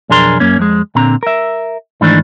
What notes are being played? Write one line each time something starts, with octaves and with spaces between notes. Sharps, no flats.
B1 F2 D4 G#4 A#4 C6
F#2 A#3 C#4
F2 G#3
A#2 D3 C4 A#5
A#4 E5
G#2 D#3 E3 A3 D4